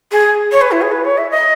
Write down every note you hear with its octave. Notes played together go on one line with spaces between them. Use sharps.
G#4
C#5
B4
E4
G#4
B4
C#5
E5
D#5